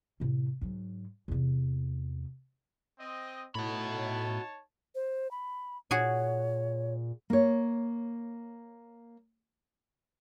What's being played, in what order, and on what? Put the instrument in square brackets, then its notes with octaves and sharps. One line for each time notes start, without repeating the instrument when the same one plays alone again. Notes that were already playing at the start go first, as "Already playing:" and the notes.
[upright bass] A2 C3
G#2 F#3
E2 C3
[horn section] C4 D#5
[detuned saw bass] A2 [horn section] D#4 C#5 A5 [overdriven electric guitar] F#4 B5
[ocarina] C5
B5
[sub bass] A#2 [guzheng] F#4 G#4 G#5 [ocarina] C#5
[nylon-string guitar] A#3 C#5